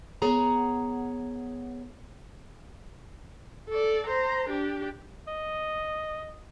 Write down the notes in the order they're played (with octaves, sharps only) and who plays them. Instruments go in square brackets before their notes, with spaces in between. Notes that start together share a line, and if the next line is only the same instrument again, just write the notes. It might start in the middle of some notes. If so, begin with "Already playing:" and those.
[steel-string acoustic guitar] B3 G#4 C#5 F#5 A#5
[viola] A4 D5
C5 A#5
D4 G4
[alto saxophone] D#5